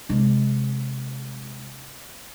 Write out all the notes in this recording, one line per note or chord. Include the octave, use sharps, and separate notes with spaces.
C3 G#3